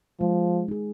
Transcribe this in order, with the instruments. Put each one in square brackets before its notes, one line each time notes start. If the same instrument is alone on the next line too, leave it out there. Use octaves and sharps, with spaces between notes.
[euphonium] F3 [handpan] G#3
[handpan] D#4 G#4